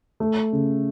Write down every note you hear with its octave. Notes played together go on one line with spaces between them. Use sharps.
A3
C#3